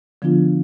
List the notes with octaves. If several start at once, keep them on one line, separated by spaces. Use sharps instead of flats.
D3 F3 B3 D4 F4